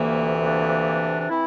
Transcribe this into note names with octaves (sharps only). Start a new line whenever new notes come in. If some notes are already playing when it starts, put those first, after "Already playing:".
Already playing: D2 C3 E3 A#3
A#3 D4
D4
E3 C4 E4